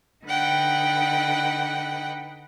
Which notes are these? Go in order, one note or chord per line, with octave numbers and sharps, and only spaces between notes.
D3 D#4 B4 F#5 G5 F#6